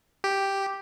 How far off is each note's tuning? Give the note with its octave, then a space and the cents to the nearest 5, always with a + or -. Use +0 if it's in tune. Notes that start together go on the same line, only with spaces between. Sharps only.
G4 +0